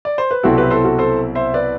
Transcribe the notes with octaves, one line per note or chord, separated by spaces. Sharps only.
D5
C5
B4
C2 B2 F#3 C4 E4 F#4 A4
G4 B4
A4 C5
F#4 A4
A4 C5
C5 E5
B4 D5